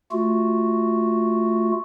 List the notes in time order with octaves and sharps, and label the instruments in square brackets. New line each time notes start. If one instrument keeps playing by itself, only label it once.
[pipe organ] A3 F4 F#4